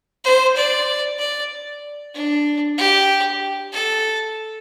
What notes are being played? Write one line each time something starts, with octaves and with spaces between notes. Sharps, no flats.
C5
D5
D5
D4
G4
A4